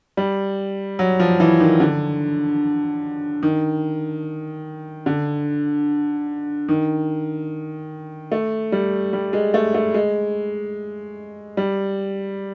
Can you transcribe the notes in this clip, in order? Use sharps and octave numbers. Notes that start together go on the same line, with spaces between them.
G3
F#3
F3
E3
D#3
D3
D#3
D3
D#3
A3
G3
G3
G#3
A3
A3
G#3
G3